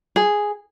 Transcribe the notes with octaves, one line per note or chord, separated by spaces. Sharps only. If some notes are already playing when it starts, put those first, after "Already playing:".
G#4